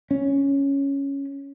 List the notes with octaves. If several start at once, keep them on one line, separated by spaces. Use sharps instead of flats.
C#4